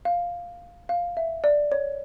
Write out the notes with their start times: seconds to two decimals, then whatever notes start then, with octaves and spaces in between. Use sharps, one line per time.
0.05 F5
0.89 F5
1.17 E5
1.44 D5
1.72 C#5